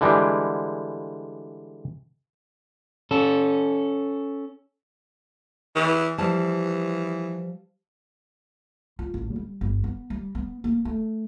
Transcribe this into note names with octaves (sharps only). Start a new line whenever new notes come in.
D3 E3 G3 G#3
C#4 A4
E3
E3 F3 G3 A5
F4
A1
G3
G1
B3
G3
B3
A#3
A3